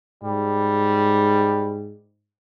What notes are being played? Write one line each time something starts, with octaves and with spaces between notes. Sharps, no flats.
G#2 G3